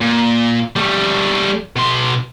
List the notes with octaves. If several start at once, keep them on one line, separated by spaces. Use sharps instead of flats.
A#2
G3 A3
B2 C6